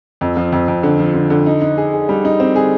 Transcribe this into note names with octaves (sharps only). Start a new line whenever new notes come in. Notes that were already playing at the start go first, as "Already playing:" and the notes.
F2
F3
F2
F2
D3
F3
D3
D3
D#4
D#4
G#4
G#4
G3
D#4
C4
G#4